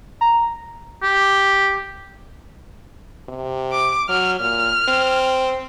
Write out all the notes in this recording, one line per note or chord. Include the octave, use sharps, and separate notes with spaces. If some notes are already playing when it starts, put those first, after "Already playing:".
A#5
G4
C3
D6
F#3 F6
A#2 F6
C4